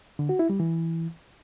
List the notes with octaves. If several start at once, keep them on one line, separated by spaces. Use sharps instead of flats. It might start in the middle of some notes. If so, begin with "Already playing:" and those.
D3
F#4
E4
G3
E3